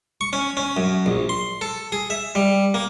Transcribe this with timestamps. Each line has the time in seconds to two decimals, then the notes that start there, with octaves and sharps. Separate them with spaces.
0.21 C#6
0.33 C#4
0.57 C#4
0.77 F#2
1.06 A#1
1.29 C6
1.61 A4
1.92 G#4
2.10 E5
2.35 G3
2.74 A#3